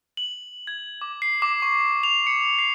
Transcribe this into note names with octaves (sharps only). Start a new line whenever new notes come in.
F#7
G#6
D6
C7
D6
C#6
F7
C#7
C7